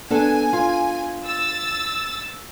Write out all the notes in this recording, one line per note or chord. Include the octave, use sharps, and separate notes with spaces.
B3 D4 A4 G#5
F4
E6 A6